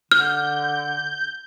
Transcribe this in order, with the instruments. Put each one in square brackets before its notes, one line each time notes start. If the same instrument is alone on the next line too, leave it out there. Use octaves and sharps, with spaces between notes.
[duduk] D3 [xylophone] F6 [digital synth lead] G6